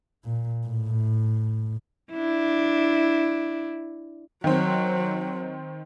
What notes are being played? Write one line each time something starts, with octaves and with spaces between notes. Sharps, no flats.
A#2
A2
D4 E4
D#3 F#3 C4